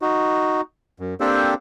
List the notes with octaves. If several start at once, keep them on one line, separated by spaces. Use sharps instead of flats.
D#4 F#4
F#2
A#3 C4 D4 G4 A4 C5